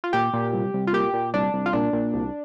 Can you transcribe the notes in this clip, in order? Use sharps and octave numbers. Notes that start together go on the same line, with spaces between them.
F4
A#2 G4
A#2
C2
C2
F4
A#2 G4
A#2
C2 D4
C2
F4
A#2 D4
A#2
C2